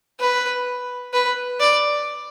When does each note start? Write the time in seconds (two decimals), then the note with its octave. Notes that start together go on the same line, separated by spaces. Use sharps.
0.20 B4
1.13 B4
1.60 D5